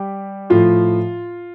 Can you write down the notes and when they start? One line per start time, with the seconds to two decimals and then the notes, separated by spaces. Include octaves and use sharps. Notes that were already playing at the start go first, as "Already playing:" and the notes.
Already playing: G3 G4
0.50 A2 F3 F4